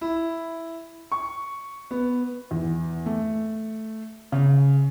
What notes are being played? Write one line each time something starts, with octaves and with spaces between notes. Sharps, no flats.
E4
C#6
B3
E2
A3
C#3